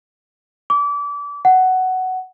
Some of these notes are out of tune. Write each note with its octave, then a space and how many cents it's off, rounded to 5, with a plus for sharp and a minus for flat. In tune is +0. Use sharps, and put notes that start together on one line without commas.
D6 -30
F#5 +10